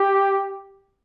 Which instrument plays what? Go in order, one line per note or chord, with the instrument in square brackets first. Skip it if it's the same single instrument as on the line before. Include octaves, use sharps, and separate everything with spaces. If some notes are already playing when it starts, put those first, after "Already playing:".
Already playing: [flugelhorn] G4